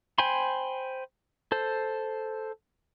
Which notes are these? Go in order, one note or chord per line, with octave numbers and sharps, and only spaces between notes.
C5 G5 G#5 B5 C6
A4 C5